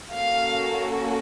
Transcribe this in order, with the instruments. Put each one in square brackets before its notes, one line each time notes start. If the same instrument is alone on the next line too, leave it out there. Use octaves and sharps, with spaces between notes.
[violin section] A#3 C#4 F#4 A4 F5